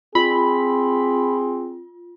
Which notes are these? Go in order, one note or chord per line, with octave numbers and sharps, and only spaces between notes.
C4 F4 G#4 B5